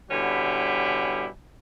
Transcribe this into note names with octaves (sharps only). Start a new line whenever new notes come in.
B2 D3 G3 C#4 E4 G4